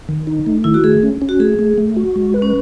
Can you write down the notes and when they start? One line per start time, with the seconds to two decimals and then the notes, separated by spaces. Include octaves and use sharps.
0.09 D#3
0.27 D#4
0.46 A3
0.64 D#3 E4
0.74 F#4
0.84 A3 G#4
1.03 C#4
1.22 C#4
1.29 F#4
1.40 A3 G#4
1.59 A3
1.78 A3
1.97 F#4
2.16 G#3
2.34 B4
2.42 C#4